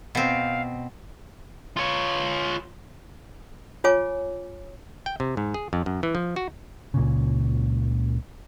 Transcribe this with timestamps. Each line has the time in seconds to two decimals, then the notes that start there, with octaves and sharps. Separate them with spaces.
0.15 B2 C4 F5
1.76 F4 C#5
3.84 F4 C#5 G#5 D6
5.06 G5
5.20 C3
5.37 G#2
5.54 G#4
5.73 F2
5.86 F#2
6.03 E3
6.15 F3
6.36 F#4
6.94 C#2 A#2 C#3